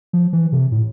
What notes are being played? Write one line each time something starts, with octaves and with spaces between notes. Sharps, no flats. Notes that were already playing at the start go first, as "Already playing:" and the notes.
F3
E3
C3
A2